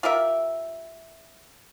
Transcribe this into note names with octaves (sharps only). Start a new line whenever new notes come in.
F4 G4 A#4 E5